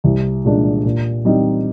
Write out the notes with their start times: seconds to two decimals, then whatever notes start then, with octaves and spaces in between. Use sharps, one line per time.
0.04 C2
0.45 A#2 G#3 D4
0.84 A#2
1.25 G3 C4 D#4